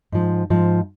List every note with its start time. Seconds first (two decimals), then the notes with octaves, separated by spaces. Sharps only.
0.12 G#2 F3
0.50 G#2 F3